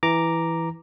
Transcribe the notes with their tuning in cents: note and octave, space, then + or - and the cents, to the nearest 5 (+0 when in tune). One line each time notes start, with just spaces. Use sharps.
E3 +0 A#5 +0 D6 +0